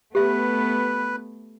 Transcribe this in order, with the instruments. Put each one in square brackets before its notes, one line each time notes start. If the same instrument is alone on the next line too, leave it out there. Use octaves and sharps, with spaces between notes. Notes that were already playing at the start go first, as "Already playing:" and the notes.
[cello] A3 B3 [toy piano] G4 E5 [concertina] B4